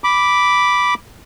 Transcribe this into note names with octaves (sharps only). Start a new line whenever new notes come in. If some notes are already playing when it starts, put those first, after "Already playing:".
B5 D6